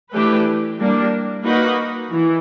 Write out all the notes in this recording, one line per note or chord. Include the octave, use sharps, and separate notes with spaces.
E3 A3 D4 G4 B4
G3 A#3 D4
A#3 D#4 F#4 B4
E3